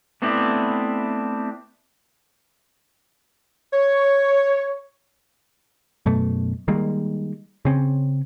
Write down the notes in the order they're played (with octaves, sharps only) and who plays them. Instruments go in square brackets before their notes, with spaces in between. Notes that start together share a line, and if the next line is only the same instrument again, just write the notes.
[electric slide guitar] A3 B3 C4 D4 E4
[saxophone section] C#5
[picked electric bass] F#2 B2 A3
D#3 G3 G#3 A#3
C#3 C4 C#4